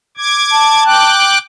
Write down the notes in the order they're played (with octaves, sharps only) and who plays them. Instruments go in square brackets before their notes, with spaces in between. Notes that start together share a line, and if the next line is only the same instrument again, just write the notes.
[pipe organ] D6 G#6
[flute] A5
[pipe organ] G5 D6 F#6